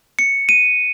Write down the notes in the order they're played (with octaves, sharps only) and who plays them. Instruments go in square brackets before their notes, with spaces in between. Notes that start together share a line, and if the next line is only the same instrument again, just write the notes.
[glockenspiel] C#7
D#7